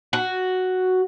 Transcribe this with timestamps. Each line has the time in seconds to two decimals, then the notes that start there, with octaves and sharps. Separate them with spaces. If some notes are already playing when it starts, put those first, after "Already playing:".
0.13 F#4